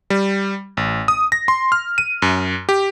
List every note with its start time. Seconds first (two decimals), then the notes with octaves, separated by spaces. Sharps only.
0.10 G3
0.77 A1
1.08 D#6
1.32 A#6
1.48 C6
1.72 F6
1.98 D#7
2.22 F#2
2.69 G4